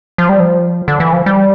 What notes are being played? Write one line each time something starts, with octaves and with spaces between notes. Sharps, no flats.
F3
G3
F3
D3
E3
F3
G3